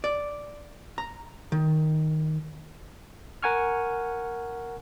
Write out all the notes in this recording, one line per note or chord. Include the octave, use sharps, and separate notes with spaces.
D5
A#5
D#3
A#4 F#5 G#5 C#6 F6